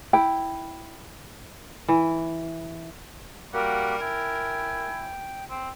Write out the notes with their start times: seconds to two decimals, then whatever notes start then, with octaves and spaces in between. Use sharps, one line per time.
0.13 E4 G5
1.88 E3
3.53 G3 A#3 F#4 G4 A#4 F#5
4.01 E4 G5 G#5
5.50 C4